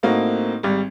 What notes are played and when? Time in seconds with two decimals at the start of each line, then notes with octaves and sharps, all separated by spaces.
0.03 A2 A#3 C4 D#4 F#4
0.63 G#1 G3